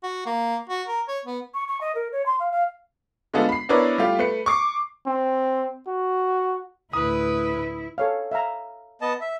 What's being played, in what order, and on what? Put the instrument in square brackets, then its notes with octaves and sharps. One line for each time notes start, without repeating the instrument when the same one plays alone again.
[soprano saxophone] F#4
A#3
F#4
A#4
C#5
B3
[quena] C#6
C#6
D#5
A#4
C#5
C6
F5
F5
[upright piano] D3 G#3 A3 B3 F4 A4
B5 C7
B3 D4 E4 A#4 B4 C#5
G3 A3 F4 G4
A3 B4 C#7
C#6 D6 C7
[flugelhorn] C4
F#4
[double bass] D2 A2 [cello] E4 [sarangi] B4 [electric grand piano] D#6
[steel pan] A4 C#5 F5
E5 F5 A#5
[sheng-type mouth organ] B3 D#5 A5
E5